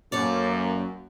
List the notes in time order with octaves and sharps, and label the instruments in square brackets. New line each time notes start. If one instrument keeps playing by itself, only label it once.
[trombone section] F#2 [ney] A#3 [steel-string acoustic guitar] A4 C#5 D5